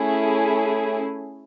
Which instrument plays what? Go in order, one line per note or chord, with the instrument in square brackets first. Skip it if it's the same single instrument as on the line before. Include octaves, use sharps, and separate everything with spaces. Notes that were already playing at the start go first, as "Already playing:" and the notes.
Already playing: [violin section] A3 C#4 E4 G#4